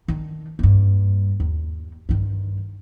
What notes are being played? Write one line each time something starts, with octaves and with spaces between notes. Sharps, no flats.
D#3 D4
G2 A#3
D#2
G2 D#3